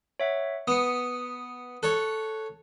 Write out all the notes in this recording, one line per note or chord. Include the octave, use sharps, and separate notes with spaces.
C#5 E5 F#5
B3 D#6 C#7
A4 C#5 F#6